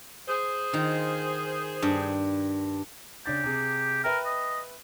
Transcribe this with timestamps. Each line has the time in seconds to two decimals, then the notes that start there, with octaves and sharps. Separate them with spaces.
0.28 G#4 C5
0.73 D#3 F4
1.82 G2
3.26 C#3 D4 G4 A6
3.44 C3 G#4
4.04 A#4 B4 E5 G5
4.25 D#5